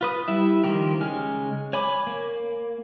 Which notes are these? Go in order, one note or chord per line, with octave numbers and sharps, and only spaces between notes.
F4 B4 D#6
G3 E4 E5
D#3 F3 A#3 G4 A#4
C#3 G#3 G#5 F6
C#5 G#5 B5 D6
A#3